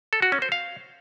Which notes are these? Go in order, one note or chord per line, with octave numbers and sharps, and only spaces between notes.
A4
F#4
C#4
C5
F5